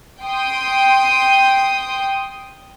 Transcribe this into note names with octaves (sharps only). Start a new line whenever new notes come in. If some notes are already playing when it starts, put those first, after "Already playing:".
G5 C6 D#6